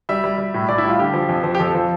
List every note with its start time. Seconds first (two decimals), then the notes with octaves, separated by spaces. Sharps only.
0.09 G3 E5
0.24 G3
0.38 G3
0.54 A2
0.68 A2 D5
0.78 E4
0.84 G3 F4
0.99 D3 G4
1.14 F3
1.29 F2
1.44 F3
1.55 G4
1.60 F2 A4
1.75 F3